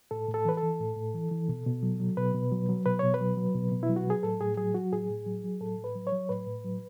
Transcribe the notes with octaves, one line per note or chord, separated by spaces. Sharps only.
A2 A4
A2
A4
E3 B4
A4
E3
A2
A2
E3
E3
B2
B2
F#3
F#3
B2 B4
B2
F#3
F#3
B2 B4
B2 C#5
B4
F#3
F#3
B2
B2
E4
F#3
F#4
F#3 G#4
A2 A4
A2 G#4
F#3 G#4
F#3 F#4
A2 G#4
A2
F#3
F#3
A2 A4
A2
B4
F#3
C#5
F#3
A2 B4
A2
F#3